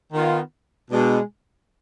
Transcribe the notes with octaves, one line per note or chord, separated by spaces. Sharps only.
D#3 B3 F4
B2 G#3 D4